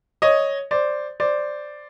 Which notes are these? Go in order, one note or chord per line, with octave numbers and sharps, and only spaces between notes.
C#5 D#5
C5 D5
C5 D5